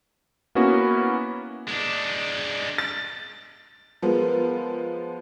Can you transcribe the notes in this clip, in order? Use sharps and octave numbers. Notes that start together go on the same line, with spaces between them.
A#3 B3 C#4 E4 F#4
G#3 D4
A6
F3 G#3 B3 A#4 B4